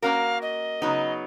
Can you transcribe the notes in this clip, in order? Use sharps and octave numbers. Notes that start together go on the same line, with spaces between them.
A#3 C#4 F#4 A#4 F5
D#5
C#3 F#3 B3 D#4